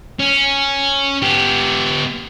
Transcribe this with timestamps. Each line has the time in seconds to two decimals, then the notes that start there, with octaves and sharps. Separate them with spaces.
0.19 C#4
1.22 B3 G4